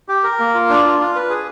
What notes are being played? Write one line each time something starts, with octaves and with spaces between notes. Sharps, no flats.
G4
A#4
A#3
F4
D4
F4
F4
B4
G#4